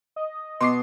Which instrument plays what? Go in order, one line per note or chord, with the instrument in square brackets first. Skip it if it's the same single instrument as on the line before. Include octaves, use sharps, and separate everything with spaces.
[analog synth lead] D#5
[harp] B2 [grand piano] C6 D6 C7